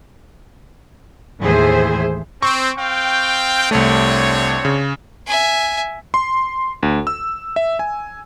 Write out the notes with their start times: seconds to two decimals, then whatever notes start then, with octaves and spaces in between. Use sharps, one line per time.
1.42 D#2 A2 E3 G#4 C5 E5
2.42 C4 C#6
2.78 C4 F5 G5
3.71 C2 A3 C4 D4 C#5
4.65 C#3
5.26 E5 G#5
6.14 C6
6.83 D2
7.07 E6
7.56 E5
7.79 G#5